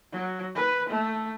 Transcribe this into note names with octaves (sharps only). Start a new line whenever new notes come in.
F#3
B4
A3